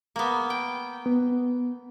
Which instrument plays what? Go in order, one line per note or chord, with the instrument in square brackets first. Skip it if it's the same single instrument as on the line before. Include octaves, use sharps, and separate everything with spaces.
[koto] A#3 B3
G5
[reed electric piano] B3